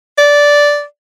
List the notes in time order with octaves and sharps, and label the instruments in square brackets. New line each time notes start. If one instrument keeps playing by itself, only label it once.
[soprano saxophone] D5